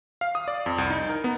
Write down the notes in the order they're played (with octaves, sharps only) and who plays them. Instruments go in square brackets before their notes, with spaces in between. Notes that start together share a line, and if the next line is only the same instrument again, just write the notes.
[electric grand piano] F5
D#6
D5
F2
C2
D#4
A#4
B3